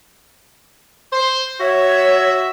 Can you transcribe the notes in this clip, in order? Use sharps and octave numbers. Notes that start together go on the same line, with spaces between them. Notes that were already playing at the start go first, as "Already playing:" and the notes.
C5
F#4 C#5 E5